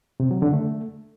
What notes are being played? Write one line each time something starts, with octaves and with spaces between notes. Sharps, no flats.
C3
F#3
D3
A3